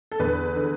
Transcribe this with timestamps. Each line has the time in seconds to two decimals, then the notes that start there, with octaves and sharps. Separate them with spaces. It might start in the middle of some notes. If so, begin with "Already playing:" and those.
0.12 A4
0.19 E2 D3 B4
0.56 D3